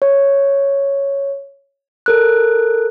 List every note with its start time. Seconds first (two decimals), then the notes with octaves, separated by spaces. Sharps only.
0.02 C#5
2.06 A4 A#4 F#6